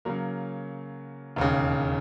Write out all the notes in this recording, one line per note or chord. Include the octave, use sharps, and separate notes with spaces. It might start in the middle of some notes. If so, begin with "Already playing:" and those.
C#3 F#3 A#3
E1 D#2 C#3